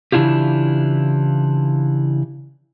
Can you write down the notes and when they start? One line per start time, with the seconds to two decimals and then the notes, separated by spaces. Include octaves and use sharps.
0.12 C#3 E3 D4 E4 F4 G4